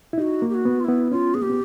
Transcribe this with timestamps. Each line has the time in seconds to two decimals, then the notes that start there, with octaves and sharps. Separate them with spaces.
0.13 E4
0.18 D#4 G4
0.22 F#4
0.42 A#3
0.50 G4
0.54 F#4
0.65 B3
0.80 F4
0.85 B3 E4
1.11 C#4 F4
1.34 B3 G#4
1.42 A#3 G4
1.50 B3